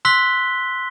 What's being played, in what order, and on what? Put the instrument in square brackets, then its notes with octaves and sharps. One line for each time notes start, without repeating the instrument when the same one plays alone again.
[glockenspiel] C6 E6 F#6 B6 G7